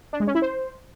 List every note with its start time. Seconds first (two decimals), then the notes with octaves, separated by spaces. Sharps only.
0.13 D4
0.20 G#3
0.27 C#4
0.35 E4
0.42 C5